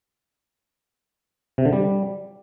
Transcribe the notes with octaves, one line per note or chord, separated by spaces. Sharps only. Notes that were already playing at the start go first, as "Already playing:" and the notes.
C3
D3
G3